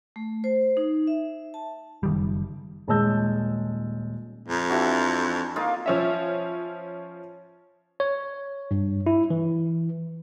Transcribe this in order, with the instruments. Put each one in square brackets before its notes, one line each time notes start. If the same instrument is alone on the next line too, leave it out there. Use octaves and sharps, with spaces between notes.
[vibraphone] A3
C5
D#4
E5
A5
[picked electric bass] F#1 D#3 G3
[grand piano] D#1 G#3 C#5 A5 E6 G6
[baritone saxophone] F2
[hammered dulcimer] E3 D4 F#4
A#3 D#4 F4
[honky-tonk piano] F3 C#4 E5
[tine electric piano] C#5
G2
E4
E3